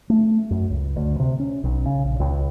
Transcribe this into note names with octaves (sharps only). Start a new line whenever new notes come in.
A3
F#2
C#2
D2
C3
C#4
B1
C#3
A#1
C#2